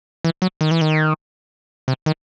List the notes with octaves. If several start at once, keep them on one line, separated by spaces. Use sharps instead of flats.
E3
F#3
D#3
E3
D#3
C3
D#3